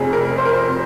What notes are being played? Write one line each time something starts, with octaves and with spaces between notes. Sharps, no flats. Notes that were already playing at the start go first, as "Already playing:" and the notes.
Already playing: F1 F2 C3 G#4
A#4
C5
A#4
C5
C3